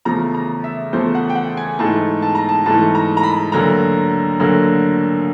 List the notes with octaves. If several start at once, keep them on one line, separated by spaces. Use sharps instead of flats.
E2 C#3 F3 A3 A#5
A#5
E5
E2 C#3 F3 A3 C5
F#5
G5
F#5
G#5
G#2 E3 A3 A5
A5
A#5
A5
G#2 E3 A3 A5
A#5
A#5
B5
D2 D3 F#3 A#3 A#5
D2 D3 F#3 A#3